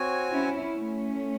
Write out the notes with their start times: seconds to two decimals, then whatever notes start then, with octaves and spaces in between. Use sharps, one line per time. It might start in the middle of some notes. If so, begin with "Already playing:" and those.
Already playing: C4 F#4 C#5 G#5
0.32 C#4 E4
0.77 A3 C#4